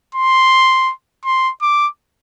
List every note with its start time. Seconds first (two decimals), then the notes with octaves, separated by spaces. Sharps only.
0.15 C6
1.25 C6
1.62 D6